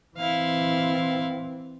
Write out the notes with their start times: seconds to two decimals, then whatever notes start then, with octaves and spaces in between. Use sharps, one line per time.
0.17 E3 C4 E4 F5